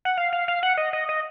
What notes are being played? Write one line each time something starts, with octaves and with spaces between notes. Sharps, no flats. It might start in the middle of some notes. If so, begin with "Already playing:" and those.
F#5
F5
F5
F5
F#5
D#5
D#5
D#5